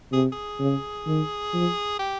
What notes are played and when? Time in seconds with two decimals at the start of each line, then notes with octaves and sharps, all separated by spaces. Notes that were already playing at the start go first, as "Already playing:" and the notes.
0.12 C3 G#4
0.33 G#4
0.60 C#3
1.07 D#3
1.54 F3
1.99 G4